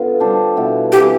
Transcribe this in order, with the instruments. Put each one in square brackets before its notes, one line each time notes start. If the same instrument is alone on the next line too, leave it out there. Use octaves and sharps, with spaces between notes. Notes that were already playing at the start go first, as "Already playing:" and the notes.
Already playing: [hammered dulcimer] D3 B3 F4
G3 D4 A4 C5
B2 B3 E4
[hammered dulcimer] E3 G3 C4 [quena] G4